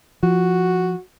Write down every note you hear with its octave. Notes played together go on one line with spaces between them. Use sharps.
F3 F#4